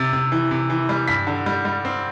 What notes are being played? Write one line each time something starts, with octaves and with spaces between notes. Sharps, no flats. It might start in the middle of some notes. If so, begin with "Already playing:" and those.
Already playing: C3 A6
C3
E3
C3
E3
G3
G2 B6
D3
G3
G3
C4